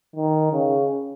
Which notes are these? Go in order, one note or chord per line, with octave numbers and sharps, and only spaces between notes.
D#3
C#3